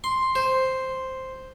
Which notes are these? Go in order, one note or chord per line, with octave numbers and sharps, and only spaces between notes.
C6
C5